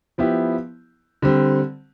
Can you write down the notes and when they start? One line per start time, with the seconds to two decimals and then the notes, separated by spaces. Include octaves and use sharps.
0.18 F3 B3 E4 G4
1.22 D3 G3 C4